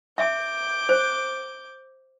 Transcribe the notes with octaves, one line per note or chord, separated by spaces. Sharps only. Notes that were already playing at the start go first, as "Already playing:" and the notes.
E5 D6 G6
C5